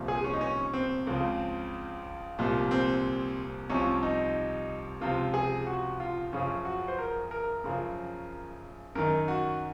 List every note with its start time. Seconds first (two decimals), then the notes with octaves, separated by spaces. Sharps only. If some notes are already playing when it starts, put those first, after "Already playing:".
Already playing: C2 A#2 F3
0.08 G#4
0.24 C#4
0.33 D#4
0.41 C#4
0.73 C4
1.07 C#2 C#3 F3
2.39 C2 A#2 F3
2.71 C4
3.69 C2 C3 F3 C#4
4.03 D#4
5.01 C#2 C3 F3 F4
5.34 G#4
5.67 F#4
6.00 F4
6.32 F#2 C#3 F3 C#4
6.65 F#4
6.88 C5
6.99 A#4
7.31 A#4
7.64 F#2 C#3 F3
8.95 F#2 D#3 A#4
9.28 F#4